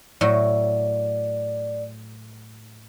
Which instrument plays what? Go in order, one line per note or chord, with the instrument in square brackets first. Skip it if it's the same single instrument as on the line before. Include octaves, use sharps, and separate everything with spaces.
[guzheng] A2 F#3 [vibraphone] D5